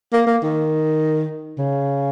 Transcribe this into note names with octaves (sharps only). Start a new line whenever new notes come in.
A#3
A#3
D#3
C#3